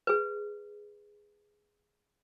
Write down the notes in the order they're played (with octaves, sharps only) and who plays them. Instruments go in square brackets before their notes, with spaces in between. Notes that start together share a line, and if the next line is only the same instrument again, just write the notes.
[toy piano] G#4 B4